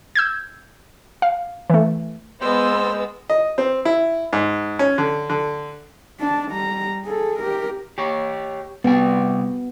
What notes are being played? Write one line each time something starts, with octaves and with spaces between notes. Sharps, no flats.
E6 G6 G#6
F5
E3 A3
G#3 B3 C5 E6
D#5
C4
E4
G#2
C#4
D3
D3
D4 A5
G3 A#5
G#4 A4
G4 A#4
G4 C#5
C3 G3 B3 G5